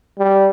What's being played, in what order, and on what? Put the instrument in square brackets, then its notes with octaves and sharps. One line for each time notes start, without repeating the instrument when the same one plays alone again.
[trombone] G3